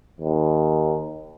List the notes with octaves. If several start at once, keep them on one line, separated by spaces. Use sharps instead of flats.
D#2